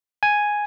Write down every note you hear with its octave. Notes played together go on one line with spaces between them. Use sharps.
G#5